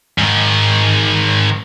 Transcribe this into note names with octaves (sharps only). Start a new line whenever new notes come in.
G#2 D#3